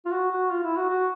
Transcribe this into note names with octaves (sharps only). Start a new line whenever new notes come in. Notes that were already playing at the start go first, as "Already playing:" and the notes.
F4
F#4
F#4
F4
E4
F#4
F#4